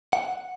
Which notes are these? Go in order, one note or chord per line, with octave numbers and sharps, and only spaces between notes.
F#5